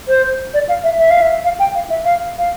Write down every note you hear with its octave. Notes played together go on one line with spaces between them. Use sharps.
C5
D5
F5
E5
E5
F5
E5
F5
G5
F5
E5
F5
F5